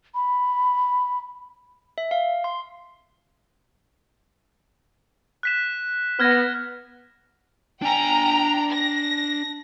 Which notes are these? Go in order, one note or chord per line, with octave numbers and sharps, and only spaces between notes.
B5
E5
F5
C6
F#6 B6 E7
B3 F6 G#6 A#6
D4 G5 G#5 A#5
A#6